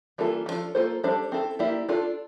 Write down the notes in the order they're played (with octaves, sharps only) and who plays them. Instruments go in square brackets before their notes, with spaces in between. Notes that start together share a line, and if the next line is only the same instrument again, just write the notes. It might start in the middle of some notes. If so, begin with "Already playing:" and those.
[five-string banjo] E3 G3 A#3 F4 A4
F3 A#3 D4 F4 A4
A#3 F4 A4 C5
G3 D4 A4 C5
C4 E4 A4
A#3 E4 G4 D5
D4 F4 A4